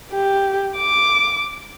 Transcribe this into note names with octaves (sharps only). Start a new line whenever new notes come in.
G4
D6